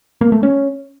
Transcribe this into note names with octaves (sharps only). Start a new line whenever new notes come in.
A#3
A3
C#4